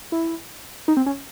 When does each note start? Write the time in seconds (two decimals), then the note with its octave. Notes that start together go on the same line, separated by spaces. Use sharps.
0.12 E4
0.88 D#4
0.97 C4
1.06 C#4